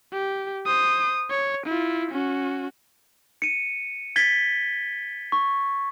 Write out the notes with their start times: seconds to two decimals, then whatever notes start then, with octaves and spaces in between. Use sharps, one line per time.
0.13 G4
0.66 C5 D#6
1.30 C#5
1.66 E4 F4
2.11 C#4 F#4
3.42 C#7 D#7
4.16 G#6 A6 B6 G7
5.32 C#6